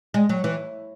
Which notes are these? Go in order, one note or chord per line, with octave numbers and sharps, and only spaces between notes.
G#3
F#3
E3